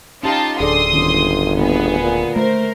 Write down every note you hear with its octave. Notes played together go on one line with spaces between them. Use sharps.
C#4 D#4 F4 G4 A5
D1 D3 G#4 A4 D5 C6 D#6
G1 D#3 C#4
D3 A#3 B3 G#4 B4
A#2
A3 A#4 C5